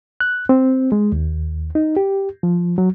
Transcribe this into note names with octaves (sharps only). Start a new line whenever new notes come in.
F#6
C4
G#3
D#2
D#4
G4
F3
F#3